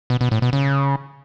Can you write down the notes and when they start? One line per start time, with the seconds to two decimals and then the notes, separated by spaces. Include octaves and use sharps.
0.10 B2
0.21 B2
0.31 A2
0.42 B2
0.53 C#3